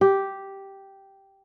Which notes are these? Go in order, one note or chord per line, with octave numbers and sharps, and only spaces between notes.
G4